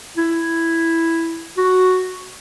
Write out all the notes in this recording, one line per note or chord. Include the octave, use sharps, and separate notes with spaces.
E4
F#4